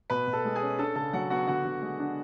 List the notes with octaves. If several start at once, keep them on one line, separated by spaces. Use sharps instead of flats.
B2 B4 B5
B2
A4 A5
G#3
G#4 G#5
C#4
D4 A4 A5
C#3 A4 A5
F#3 F#4 F#5
B3 F#4 F#5
D3 F#4 F#5
D3
G#3
D4